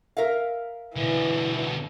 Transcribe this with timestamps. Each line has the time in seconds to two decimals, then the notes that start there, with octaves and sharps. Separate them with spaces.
0.17 A#4 E5 F5
0.96 B2 D3 E3